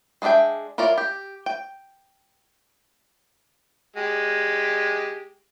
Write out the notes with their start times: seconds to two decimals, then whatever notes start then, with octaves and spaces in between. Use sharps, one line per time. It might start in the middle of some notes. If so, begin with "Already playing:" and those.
0.22 G#3 B3 D4 E5 G5
0.78 E4 F4 A#4 C#5 D5
0.98 G4
1.46 G5
3.96 G#3 G4